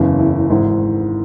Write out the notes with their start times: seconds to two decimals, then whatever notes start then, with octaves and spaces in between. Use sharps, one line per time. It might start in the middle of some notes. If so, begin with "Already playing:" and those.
Already playing: F#1 E2 C#3 E4
0.19 E4
0.50 G#1 G#2 E3 E4